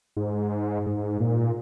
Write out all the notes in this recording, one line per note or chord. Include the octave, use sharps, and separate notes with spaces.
G#2
G#2
A#2